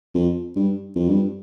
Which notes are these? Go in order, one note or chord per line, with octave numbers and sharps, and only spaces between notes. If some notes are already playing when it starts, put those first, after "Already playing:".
F2
G2
F2
G2